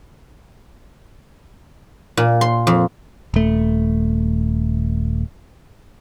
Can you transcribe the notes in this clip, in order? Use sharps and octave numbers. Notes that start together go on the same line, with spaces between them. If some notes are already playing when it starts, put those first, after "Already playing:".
A#2
C6
F2
D#1 A3